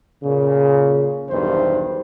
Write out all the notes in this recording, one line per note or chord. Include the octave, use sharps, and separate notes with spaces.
A#2 C#3
B1 E2 G2 D#3 C5